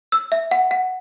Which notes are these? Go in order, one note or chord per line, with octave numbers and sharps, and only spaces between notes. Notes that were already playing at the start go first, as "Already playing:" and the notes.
E6
E5
F#5
F#5